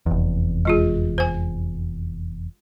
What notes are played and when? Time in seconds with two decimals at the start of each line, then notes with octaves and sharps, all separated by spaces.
0.06 F1 E2
0.65 G#3 F4 G#4
1.18 C5 G#5